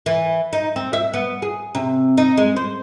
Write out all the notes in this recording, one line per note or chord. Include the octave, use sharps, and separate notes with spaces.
E3
D#4
C4
E5
B3
G#4
C3
D#4
G#3
C5